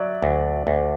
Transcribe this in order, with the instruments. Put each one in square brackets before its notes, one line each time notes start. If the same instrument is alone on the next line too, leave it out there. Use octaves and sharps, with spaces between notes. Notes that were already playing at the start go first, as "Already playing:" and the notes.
Already playing: [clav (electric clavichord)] F#3 [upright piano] D5 E5
[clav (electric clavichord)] D2
D2